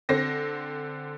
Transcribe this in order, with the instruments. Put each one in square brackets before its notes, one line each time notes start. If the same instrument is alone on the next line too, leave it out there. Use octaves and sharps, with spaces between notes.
[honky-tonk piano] D3 C4 A#6